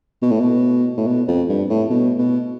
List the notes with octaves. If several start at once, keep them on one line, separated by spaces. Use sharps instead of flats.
B2
A2
B2
A2
B2
F2
G2
A2
B2
B2